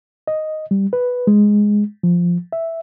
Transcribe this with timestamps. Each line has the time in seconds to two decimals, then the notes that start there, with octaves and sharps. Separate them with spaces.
0.28 D#5
0.71 G3
0.93 B4
1.27 G#3
2.03 F3
2.53 E5